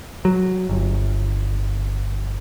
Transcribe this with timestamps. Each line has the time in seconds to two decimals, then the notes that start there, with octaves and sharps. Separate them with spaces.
0.25 F#3
0.69 G1